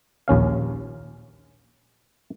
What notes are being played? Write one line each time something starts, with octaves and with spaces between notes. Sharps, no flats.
A#1 D#2 C#4 F5